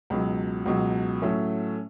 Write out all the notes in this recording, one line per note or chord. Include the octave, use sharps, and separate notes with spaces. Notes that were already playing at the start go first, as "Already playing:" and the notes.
C#2 B2 F#3
C#2 B2 F#3
A2 F#3 A3 C#4